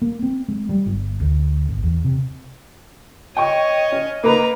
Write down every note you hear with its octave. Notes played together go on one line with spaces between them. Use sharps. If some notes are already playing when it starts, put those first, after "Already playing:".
A#3
C4
G#3
G3
G1
D2
G#1
E2
C3
C#5 D#5 G5 C#6
C#4
A#3 D#4 B4 A#5